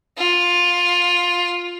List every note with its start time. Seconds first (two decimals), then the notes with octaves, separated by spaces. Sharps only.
0.18 F4